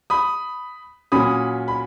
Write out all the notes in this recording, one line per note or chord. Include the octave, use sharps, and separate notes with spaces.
B5 D#6
A#2 F#3 C#4 B5 D#6
B5